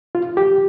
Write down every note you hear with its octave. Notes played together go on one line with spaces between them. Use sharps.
F4
G4